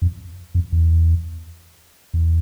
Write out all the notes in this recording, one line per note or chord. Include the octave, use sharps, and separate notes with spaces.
F2
F2
E2
E2